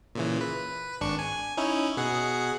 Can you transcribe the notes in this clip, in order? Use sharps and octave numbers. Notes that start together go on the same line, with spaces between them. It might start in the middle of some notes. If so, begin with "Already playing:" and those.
A#2 C#3 E3
B4
G#1 D4 C#6
G#5
C#4 D#4 E4
B2 G#4 F#5